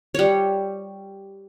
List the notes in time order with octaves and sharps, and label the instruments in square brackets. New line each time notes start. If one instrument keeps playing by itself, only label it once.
[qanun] G3 C#5